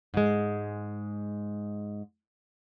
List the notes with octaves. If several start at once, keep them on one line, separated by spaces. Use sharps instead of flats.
G#2 G#3